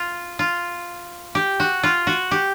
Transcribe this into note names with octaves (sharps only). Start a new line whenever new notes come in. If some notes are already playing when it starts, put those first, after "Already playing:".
Already playing: F4
F4
G4
F#4
F4
F#4
G4